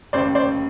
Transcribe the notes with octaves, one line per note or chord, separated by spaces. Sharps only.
F1 D#2 C#3 C5 D5
C5 D5